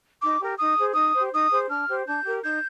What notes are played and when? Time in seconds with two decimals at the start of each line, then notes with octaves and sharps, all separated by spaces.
0.21 D#4 D6
0.40 G4 A#4
0.59 D#4 D#6
0.77 G#4 C5
0.95 D#4 D#6
1.14 G4 C5
1.32 D#4 D#6
1.51 G#4 C5
1.69 D4 F6
1.88 G4 C5
2.07 D4 G6
2.25 G4 A#4
2.44 D#4 G6